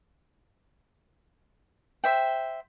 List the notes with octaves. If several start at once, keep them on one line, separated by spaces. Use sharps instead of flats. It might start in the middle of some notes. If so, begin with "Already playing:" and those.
C5 E5 G5